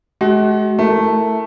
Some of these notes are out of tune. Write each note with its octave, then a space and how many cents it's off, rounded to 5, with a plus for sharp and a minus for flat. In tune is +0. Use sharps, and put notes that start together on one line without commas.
G#3 +45 F#4 +30
A3 +0 E4 +0 A#4 -5